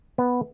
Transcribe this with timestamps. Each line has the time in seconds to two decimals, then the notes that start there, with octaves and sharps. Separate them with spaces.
0.18 B3